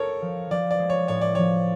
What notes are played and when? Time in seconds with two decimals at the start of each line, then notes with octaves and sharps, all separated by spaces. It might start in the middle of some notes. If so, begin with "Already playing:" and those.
Already playing: A4 A#4 C#5
0.22 F3
0.50 F3 D5
0.71 D5
0.79 G#3
0.90 C#5
1.08 A2 C#5
1.21 D5
1.35 F3 C#5